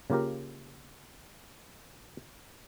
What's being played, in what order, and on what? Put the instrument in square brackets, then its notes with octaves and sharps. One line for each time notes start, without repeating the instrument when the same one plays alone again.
[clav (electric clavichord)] C#3 A#3 F4 G4 A#4